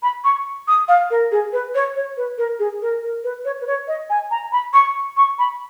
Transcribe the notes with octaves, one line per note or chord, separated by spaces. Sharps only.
B5
C#6
D#6
F5
A#4
G#4
B4
C#5
C#5
B4
A#4
G#4
A#4
A#4
B4
C#5
B4
C#5
D#5
G#5
A#5
B5
C#6
C#6
B5